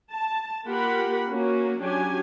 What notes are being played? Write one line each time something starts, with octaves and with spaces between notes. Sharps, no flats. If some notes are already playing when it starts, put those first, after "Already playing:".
A5
A#3 F4 G4 A#4 F#5 B5
A#3 C#4 F#4
F#3 C#4 D4 G4 G#5